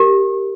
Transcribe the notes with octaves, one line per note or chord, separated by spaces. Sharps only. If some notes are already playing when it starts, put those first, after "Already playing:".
Already playing: G4 A#4